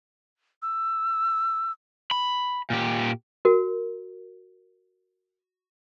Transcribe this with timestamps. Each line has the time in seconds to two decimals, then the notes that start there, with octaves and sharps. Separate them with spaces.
0.62 E6
2.11 B5
2.70 A#2 G4
3.45 F#4 A#4